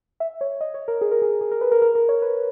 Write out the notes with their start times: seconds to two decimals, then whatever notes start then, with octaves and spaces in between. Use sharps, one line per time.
0.20 E5
0.41 C#5
0.61 D#5
0.74 C#5
0.88 A#4
1.01 G#4
1.11 A#4
1.22 G#4
1.41 G#4
1.52 A#4
1.61 B4
1.72 A#4
1.82 A#4
1.95 A#4
2.09 C#5
2.22 B4